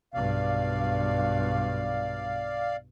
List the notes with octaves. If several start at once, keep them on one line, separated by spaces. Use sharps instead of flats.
B1 G2 D5 F5